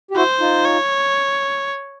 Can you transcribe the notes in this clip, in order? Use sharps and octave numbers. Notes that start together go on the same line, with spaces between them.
G4
E4 F#4 C5
D#4 F4
C#5